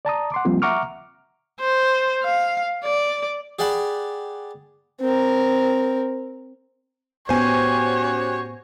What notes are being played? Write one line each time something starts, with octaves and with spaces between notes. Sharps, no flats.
D5 A5 A#5 D#6
F#5 C6 D6
F3 G3 A#3 C4 F4
E5 F#5 A#5 C#6 D6 F6
C5
F5
D5
G4 G#4 D5 F#5 A5 B5
C4 A#4
A2 B3 C#4 F#4 G4 C5 C#5 G#5